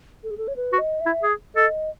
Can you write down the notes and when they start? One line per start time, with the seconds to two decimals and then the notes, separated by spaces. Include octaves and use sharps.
0.24 A4
0.31 G#4
0.38 A4
0.48 C#5
0.56 B4
0.73 F#4
0.78 D#5
1.01 E5
1.06 E4
1.23 G#4
1.55 A4 D#5